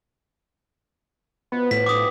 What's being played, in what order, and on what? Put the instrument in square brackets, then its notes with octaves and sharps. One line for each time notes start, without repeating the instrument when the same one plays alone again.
[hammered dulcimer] B2 F4 C5 [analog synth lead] B3
[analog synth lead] A2 [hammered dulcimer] F5 C6 [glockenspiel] B6
[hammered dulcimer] B3 D4 G4 [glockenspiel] D6 D#6